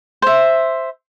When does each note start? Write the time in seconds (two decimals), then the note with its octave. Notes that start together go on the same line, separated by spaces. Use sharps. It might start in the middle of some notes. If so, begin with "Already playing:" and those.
0.22 C5 E5